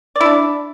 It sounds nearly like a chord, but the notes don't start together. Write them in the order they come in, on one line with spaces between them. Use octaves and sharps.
D5 E4 D4